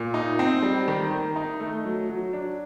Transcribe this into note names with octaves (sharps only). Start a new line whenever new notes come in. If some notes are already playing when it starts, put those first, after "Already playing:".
Already playing: A#2
D#4
C4
G3
D#3
D#3
D#4
A3
F#3
F#3
D4